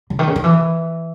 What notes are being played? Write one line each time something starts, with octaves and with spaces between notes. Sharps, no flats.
C#3
D#3
C#3
D#3
E3